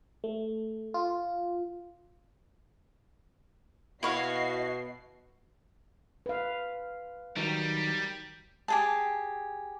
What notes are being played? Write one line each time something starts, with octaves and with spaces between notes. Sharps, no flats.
A3
F4
B2 E4 F#4 C#5 D#5 F5 C7
B4 F5
D#3 F#3 G3
G4 G#4 A5